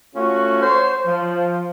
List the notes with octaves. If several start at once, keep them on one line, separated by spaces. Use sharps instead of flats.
A3 C#4 F4 F#4
C5 C#5
F3